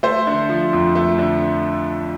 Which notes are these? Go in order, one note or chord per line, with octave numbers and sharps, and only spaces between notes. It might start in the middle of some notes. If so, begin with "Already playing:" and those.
A3 C5
D3
F3
F2
A3
D3